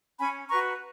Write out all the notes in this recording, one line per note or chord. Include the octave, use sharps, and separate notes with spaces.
C#4 G#5 B5
F#4 B4 A#5 C#6